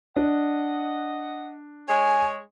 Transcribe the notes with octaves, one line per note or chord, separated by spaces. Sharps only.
D4 D#5 F#5
G#3 C#5 G#5